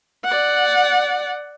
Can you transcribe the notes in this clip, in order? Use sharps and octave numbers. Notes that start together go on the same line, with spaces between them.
D5 F#5